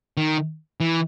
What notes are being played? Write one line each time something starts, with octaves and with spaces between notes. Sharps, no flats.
D#3
E3